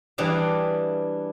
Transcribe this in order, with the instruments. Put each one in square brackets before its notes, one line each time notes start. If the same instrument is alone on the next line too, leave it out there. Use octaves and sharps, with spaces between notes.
[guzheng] E3 G3 D4 G#4 F5